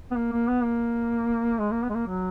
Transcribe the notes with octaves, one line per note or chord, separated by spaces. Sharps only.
B3
A#3
A#3
B3
A#3
G#3
A#3
B3
G#3
A#3
F#3